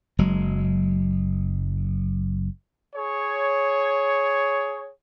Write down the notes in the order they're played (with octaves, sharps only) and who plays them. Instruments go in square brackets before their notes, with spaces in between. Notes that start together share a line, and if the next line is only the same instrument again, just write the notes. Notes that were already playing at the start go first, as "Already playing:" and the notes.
[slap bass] F#1 F#3 G#3
[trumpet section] G#4 C#5